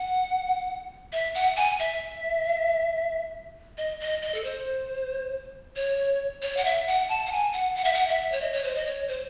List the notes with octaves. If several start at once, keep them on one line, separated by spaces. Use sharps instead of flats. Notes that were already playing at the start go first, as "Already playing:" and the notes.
Already playing: F#5
E5
F#5
G#5
E5
D#5
D#5
D#5
A4
C5
C#5
C#5
F#5
E5
F#5
A5
F#5
G#5
F#5
F#5
E5
F#5
E5
C#5
D#5
C#5
C5
D#5
C#5
C5